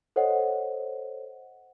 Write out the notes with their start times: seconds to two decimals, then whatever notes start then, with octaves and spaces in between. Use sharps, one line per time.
0.16 A4 C5 C#5 D#5 F#5